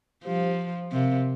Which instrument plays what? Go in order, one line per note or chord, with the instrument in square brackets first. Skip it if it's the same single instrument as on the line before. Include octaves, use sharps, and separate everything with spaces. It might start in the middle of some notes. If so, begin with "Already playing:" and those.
[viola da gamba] F3 [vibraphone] G3 D4 G4 C5 F5
[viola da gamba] C3 [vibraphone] C4 A#4 F5